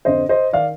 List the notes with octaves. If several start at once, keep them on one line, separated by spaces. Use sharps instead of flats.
F2 D3 C5 D#5
C5 D#5
D#3 D5 F5